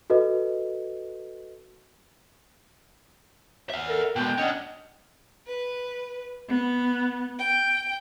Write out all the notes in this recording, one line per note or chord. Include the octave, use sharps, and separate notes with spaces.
F#4 A4 B4 D#5
E5 F#5
A4 A#4
B2 G#3 G5
C#4 D4 D#5 F#5
B4
B3
G5